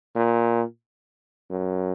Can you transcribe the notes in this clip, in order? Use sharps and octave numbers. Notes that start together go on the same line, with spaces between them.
A#2
F#2